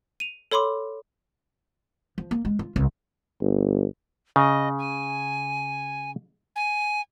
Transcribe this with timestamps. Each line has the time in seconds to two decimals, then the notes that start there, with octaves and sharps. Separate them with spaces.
0.20 D#7 F7
0.51 A4 C#5 B5 C6 D6
2.18 F3
2.31 A#3
2.45 G#3
2.59 F4
2.76 C2
3.41 G1
4.36 C#3 D#5
4.79 G#5
6.56 G#5